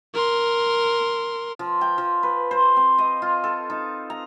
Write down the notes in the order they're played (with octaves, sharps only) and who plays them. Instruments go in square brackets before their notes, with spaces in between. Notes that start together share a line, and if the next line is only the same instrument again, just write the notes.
[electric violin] A#4 C6
[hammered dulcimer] F3
G5
F3
B4
C5
C4
D#5
F4
A4
D#4
A#5